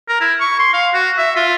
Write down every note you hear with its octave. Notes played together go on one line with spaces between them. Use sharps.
A#4
E4
C#6
C6
F5
F#4
E5
F4